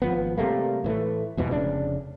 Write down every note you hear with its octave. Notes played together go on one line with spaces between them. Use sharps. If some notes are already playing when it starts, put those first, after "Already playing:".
G#1 F3 B3
C3 G3 A3 A#3
A2 E3 A3
E2 G#2 B2 E3
F1 C#3 D4